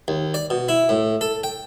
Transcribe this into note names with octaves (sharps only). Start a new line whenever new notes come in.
D#2
D5
B2
E4
A2
A4
G5